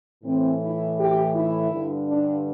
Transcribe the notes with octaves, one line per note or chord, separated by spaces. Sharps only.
A2 E3 C4
E4
G4
E4
G2 D3
D4